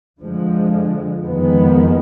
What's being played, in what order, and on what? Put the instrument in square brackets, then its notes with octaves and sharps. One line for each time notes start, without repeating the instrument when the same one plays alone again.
[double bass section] F2 D3 F3 G#3
F2 D#3 G#3 B3